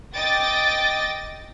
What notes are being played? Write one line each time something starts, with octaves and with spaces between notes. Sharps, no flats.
D#5 G5 D6 A6 A#6